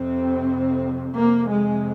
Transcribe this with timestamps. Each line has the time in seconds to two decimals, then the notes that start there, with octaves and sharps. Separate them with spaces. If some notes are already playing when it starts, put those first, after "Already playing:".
Already playing: F2 C3 C4
1.16 F2 C3 A#3
1.51 G#3